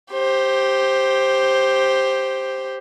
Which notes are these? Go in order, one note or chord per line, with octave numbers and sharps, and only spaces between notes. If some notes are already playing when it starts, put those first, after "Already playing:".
G4 C5